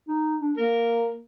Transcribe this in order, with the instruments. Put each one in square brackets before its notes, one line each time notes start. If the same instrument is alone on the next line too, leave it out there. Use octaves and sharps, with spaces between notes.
[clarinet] D#4
D4
[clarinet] A#3 [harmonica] A#4